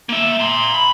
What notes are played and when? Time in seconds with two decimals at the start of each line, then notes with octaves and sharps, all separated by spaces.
0.09 A#3 E5
0.40 A#5 C6
0.74 B5